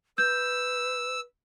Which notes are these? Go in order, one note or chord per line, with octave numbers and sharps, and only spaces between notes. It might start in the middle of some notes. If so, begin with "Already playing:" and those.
B4 E6 G6